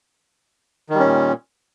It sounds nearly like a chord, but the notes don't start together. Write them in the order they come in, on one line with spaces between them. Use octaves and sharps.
D#3 G3 C#4 A#2